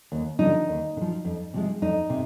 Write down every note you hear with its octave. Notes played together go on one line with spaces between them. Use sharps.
D#2
D3 F3 D#4
D#2
D3
F3
F2
C3 F3 G#3
F2 D#4
C3